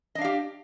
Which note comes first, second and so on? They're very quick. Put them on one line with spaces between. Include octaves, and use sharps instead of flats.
D#5 D4 F5 G4